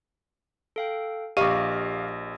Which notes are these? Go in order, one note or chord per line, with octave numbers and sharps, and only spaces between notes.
A4 F5 G5
A#1 G4 D#5 F5 D6 D#7